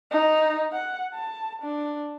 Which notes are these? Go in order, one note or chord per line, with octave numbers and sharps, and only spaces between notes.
D#4
F#5
A5
D4